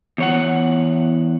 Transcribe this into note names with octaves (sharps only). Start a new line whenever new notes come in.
E2 C#5 F#5